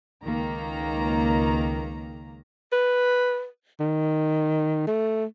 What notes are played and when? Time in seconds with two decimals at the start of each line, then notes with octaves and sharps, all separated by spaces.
0.23 C#2 D#3 A#3 A#5
2.72 B4
3.80 D#3
4.87 A3